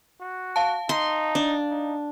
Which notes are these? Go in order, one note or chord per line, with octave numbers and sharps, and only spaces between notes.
F#4
F5 A5
D#4 C6
D4
D#4